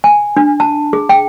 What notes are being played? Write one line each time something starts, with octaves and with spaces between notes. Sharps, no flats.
G#5
D4
A5
G#4
G5